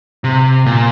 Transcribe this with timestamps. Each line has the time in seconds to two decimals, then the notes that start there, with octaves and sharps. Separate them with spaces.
0.24 C3
0.66 A#2